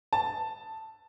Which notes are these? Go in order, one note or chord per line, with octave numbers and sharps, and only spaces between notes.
A5